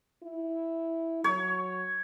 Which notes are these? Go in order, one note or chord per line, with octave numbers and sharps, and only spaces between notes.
E4
F#3 C#5